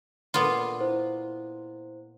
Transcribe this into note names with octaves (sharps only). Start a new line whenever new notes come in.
A#2 B3 F4
E4 C5